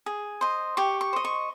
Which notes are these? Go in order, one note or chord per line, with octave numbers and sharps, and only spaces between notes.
G#4
C5 D#5
G4 C#6
C#6
C5 D#5
C#6